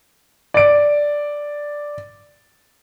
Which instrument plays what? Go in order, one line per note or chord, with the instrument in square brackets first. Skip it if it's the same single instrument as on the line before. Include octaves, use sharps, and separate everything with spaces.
[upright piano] D5 D7